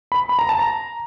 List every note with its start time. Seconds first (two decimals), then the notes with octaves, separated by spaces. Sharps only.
0.12 B5
0.29 B5
0.39 A#5
0.49 A5
0.59 A#5